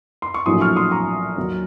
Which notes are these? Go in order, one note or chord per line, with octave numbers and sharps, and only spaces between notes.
C6
C#6
A#1 A2 F#3 C6 D#6
C#6 F6
C6 D#6
A#5 C#6
D#2 D#3 F#3